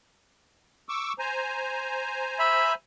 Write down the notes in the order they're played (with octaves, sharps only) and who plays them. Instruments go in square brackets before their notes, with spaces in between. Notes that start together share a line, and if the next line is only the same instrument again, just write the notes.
[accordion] C#6 D6 E6
C5 G#5 A#5
[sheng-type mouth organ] E5 B5